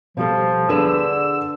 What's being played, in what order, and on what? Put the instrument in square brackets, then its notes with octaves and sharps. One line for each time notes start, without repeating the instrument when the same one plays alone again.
[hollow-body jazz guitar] B2 G3 A4 [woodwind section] F3
[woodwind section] D3 E6 [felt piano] D4 A4 [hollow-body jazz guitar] G#4 B4